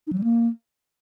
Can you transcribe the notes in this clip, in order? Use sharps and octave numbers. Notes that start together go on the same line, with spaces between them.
D#4
F#3
G3
A#3